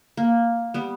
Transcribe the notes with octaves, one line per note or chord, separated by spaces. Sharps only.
A#3
G3 B3